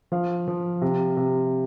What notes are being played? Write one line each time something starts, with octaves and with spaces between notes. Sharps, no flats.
F3 F5
F3
C3
C3